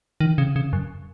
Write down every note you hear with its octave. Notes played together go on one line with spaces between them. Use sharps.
D#3
C#3
C#3
F#2